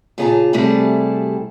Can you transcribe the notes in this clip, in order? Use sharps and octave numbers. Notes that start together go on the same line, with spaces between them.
A#2 C#3 G#4 D5 A5 A#5
C3 G3 A3 E4 G#4 A4